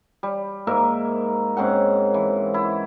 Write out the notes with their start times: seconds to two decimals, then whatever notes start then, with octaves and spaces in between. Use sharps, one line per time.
0.23 G3
0.67 G#2 A#3 A#4 E5
1.57 G#2 C4 C#4 F#5
2.14 E3
2.54 E4